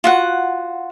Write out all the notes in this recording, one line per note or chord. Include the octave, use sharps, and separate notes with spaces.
F4 F#4 F#5